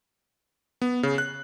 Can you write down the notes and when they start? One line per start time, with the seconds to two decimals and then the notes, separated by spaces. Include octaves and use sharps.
0.82 B3
1.03 C#3
1.18 F#6